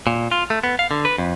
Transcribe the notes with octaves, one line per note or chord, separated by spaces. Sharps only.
A#2
F4
A3
B3
F5
D3
B4
F2